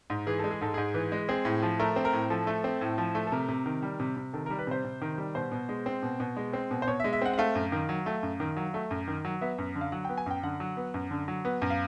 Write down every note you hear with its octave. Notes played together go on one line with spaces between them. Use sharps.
G#2
E3 G#4
G#3 A4
G#4
G#2 A4
G#2 G#4
E3
G#3
C4 G#4
A2
F3
A3 A#4
C4
A#4
A2
F3 A4
A3
C4
A2
F3
A3
A4
C3 A#4
C3
D#3
G3
C3
C3
D#3 A4
A#4
G3
B4
C3 C5
C3
D#3
G3
B2 C5
B2
G#3
C4
B2
B2
G#3
C4
B2
C5
B2 C#5
E5
G#3
E5
C4 F#5
F#5
A3 F5
F#2
D#3
F#3
A3
F#2
D#3
F#3
A3
F#2
D#3
F#3
B3 E5
F#2
D3
F5
F#3 F#5
G5
B3
G#5
F#2 G5
D3 F#5
F#3
B3
F#2
D3
F#3
B3
F#2
F5